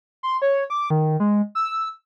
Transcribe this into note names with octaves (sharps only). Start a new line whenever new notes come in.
C6
C#5
D6
D#3
G#3
E6